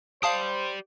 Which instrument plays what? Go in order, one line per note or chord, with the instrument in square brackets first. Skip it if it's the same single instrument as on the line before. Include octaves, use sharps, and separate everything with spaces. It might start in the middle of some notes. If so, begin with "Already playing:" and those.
[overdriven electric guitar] G4 D5 [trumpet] C5 [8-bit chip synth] F5 A5 D#6